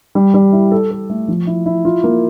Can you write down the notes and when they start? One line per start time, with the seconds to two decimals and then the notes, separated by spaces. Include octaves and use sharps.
0.15 G3
0.34 G3
0.53 E4
0.72 A4
0.91 A4
1.10 A3
1.28 F3
1.47 E4
1.66 E4
1.85 F4
2.04 A#3